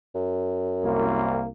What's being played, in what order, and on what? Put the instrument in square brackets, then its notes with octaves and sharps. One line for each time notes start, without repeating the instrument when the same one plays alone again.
[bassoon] F#2
[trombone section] C2 A#3